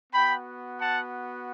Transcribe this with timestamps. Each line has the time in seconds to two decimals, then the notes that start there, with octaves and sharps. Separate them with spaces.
0.13 B3 F#4 G5 B5
0.80 F#5 A5